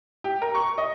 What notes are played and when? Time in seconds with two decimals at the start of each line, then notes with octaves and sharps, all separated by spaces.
0.24 G4
0.42 A#4
0.55 C#6
0.78 D#5